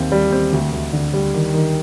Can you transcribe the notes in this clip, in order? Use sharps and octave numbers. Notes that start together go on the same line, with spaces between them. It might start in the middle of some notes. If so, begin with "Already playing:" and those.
Already playing: D#2 C4
G3
C4
D2
D2
D3
G3
D#3
D#3